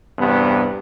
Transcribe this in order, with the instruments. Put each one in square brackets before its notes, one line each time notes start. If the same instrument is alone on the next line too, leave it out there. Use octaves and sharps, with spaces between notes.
[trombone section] E2 G2 C3 B3